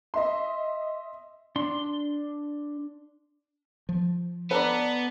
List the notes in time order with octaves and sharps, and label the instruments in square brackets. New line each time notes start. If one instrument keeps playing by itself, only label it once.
[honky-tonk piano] D#5 E5 C6
[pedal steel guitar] D4 C6
[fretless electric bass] F3
[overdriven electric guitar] B3 [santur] D4 A4 [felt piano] B4 A#5 B5